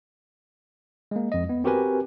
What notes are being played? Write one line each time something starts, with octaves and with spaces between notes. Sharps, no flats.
G#3 A#3
F2 D#5
B3
C4 F#4 G4 A#4 B4 G#5